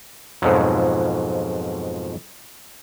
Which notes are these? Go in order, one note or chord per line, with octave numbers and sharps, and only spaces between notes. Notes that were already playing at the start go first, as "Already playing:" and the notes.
F2 G#2 B2 F3 F#3